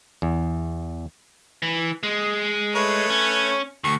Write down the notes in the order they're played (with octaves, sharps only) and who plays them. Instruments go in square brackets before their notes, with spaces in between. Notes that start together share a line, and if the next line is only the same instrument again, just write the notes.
[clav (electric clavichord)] E2
[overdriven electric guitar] E3
G#3
[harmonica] A3 B4 C#5
[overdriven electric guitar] C#4
[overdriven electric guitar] D2 [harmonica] C#6